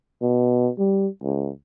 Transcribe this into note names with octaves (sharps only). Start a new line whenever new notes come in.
B2
G3
C#2